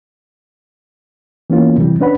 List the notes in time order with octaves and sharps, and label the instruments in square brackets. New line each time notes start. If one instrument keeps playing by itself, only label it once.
[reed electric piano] E3 A#3 B3 C#4 F4
C3 E3 G3
C#4 D4 B4 F#5 B5